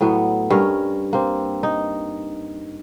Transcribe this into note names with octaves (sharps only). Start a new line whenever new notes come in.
A2 F#3 B3
G2 C#4 A#4
A#3 C4
D#4